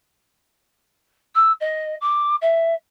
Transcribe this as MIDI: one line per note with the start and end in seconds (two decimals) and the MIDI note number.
1.35 1.52 88
1.60 1.95 75
2.01 2.35 86
2.41 2.74 76